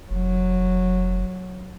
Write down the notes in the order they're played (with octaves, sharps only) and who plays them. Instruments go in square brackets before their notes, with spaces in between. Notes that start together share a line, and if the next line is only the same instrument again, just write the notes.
[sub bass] F1 [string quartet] F#3